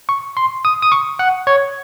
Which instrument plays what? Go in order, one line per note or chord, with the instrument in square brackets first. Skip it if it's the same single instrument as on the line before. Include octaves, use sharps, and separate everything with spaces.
[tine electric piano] C#6
C6
D#6
D#6
C#6
F#5
C#5